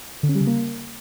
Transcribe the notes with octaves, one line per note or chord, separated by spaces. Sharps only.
D3
C#4
G3
C#3
A#3